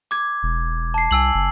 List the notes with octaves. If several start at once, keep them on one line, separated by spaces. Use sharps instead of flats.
D6 G#6
E1
A5 C7
C2 G#5 E6 F#7
F#1